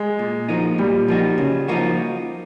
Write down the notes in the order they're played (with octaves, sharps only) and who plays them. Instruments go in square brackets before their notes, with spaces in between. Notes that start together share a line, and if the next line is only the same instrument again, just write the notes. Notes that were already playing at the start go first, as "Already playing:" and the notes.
Already playing: [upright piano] G#3
[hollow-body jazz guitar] A#2
F3 A#3 D#4 F#4
[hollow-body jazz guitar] A#2 [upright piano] G3
[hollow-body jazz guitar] F3 A#3 D#4 F#4
C#3
F3 A#3 D#4 F#4